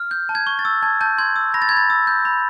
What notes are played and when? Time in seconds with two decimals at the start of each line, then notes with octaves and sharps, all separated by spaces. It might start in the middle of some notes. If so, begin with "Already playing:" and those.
Already playing: F6
0.11 G6
0.29 A5
0.35 G#6
0.47 C#6
0.59 A6
0.65 E6
0.83 A5 G#6
1.01 A5 G6
1.18 C6 G#6
1.36 E6
1.54 B5 A#6
1.62 A6
1.69 B5 G#6
1.77 A6
1.90 E6
2.07 G6
2.25 B5